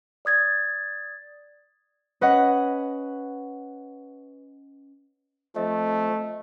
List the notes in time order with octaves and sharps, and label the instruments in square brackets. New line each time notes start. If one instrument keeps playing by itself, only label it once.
[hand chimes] D5 D#6 G#6 A6
[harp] C#4 B4 D#5 F#5
[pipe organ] F3 C4 [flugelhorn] A3 [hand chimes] D#5